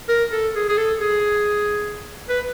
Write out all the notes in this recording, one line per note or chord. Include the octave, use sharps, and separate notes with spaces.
A#4
A4
G#4
G#4
A4
G#4
B4